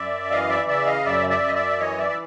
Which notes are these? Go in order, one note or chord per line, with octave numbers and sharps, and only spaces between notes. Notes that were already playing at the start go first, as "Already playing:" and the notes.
Already playing: F#2 D5 E5
E3 D#5 F5
D5 E5
C#3 D5 E5
D#5 F5
F#2 D5 E5
D5 E5
F#2
D#5
D5 E5
E3 C#5 D#5
D5 E5
E5